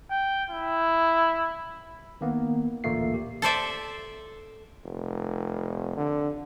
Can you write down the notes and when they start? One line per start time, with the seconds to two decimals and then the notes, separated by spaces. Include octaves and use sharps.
0.11 G5
0.50 E4
2.21 D#3 A#3 B3
2.84 A1 D2 A#2 A3 A#3 C7
3.14 G4
3.42 A4 C5 D5 E5
4.85 F1
5.97 D3